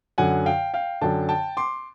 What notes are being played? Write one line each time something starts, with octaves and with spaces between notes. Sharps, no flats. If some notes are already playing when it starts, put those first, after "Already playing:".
F#2 D3 F#5 G#5
F5 G5
F5 G5
F#2 D3 G5 A5
G5 A5
C6 D6